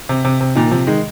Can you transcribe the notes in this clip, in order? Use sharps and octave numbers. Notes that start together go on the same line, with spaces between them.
C3
C3
C3
A#2 D#3
C3 F3
D#3 G#3